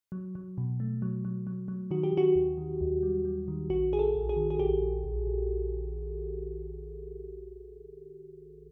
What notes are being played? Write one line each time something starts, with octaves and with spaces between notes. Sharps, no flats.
F#3
F#3
B2
A3
F#3
F#3
F#3
F#3
D#3 F#4
G4
D#3 F#4
D#2
D#3
D#2
G3
G3
D#3
A#1 F#4
A#1 G#4
A4
A#1
G#4
D#3
G#4
A#1 G4
A#1
A#1
A#1